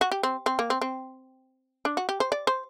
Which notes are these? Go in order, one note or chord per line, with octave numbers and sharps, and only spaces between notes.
F#4
G4
C4
C4
A#3
C4
C4
D4
F#4
G4
C5
D5
C5